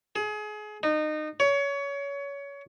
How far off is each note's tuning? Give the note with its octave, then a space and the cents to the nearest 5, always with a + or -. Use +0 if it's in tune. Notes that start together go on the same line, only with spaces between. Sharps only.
G#4 +30
D#4 -25
C#5 +25